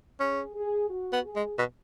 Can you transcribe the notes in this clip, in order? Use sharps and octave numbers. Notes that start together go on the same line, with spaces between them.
C#4 G#4
G#4
F#4
B3
G#4
G#3
B2